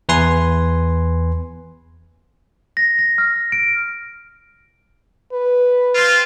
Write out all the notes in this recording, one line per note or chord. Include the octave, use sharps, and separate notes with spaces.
E2 B4 G#5 C6
A#6
A#6
F6
D7
B4
C4 F4